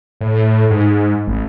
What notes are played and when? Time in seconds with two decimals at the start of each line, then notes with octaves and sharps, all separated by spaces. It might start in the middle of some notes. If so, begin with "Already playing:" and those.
0.21 A2
0.70 G#2
1.27 A1